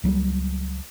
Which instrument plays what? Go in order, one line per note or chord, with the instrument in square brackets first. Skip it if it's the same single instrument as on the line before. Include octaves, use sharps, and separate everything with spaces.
[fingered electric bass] C#2 F#3 G3 A#3